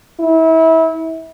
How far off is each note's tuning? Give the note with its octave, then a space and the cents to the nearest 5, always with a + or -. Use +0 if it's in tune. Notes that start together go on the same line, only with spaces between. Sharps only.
E4 -30